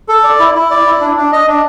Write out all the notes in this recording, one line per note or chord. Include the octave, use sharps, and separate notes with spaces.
A4
D5
E4
E4
D5
E4
D4
D4
D#5
D4